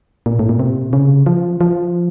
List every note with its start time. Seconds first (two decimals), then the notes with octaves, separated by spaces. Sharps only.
0.26 A#2
0.39 A2
0.49 A#2
0.60 C3
0.93 C#3
1.26 F3
1.61 F3